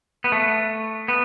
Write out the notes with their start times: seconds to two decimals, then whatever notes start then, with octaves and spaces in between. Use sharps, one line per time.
0.24 B3
0.32 A3
1.08 B3